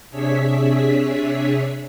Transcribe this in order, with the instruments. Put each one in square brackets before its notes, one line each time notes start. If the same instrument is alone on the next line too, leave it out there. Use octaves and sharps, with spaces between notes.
[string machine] C3 D4 G#4 C#5 E5 B6